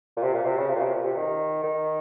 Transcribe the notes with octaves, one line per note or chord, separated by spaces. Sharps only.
A#2
C3
A#2
C3
C#3
C3
A#2
C3
A#2
C3
D#3
D#3